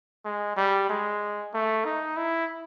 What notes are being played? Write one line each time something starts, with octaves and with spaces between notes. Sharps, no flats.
G#3
G3
G#3
A3
D#4
E4